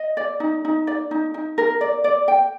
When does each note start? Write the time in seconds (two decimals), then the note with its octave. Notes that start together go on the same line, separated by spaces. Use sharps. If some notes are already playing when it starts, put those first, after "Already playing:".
Already playing: D#5
0.17 D5
0.40 D#4
0.65 D#4
0.87 D5
1.11 D#4
1.34 D#4
1.58 A#4
1.81 D5
2.04 D5
2.28 G5